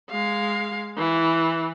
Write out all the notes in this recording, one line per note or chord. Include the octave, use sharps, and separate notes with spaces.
G#3 F5
E3